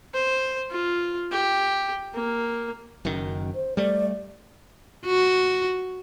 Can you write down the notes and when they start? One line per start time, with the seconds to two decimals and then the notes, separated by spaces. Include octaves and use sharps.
0.14 C5
0.71 F4
1.31 G4
2.14 A#3
3.05 F#1 F#2 D#3
3.55 C5
3.77 G3 A3 D5
5.06 F#4